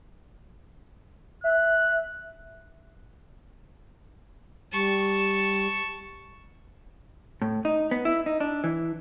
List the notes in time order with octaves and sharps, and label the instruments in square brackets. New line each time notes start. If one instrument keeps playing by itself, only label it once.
[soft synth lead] E5 [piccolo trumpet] F#6
[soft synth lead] G3 [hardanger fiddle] A5 C#6
[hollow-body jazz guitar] A2
D#4
B3
E4
D#4
D4
E3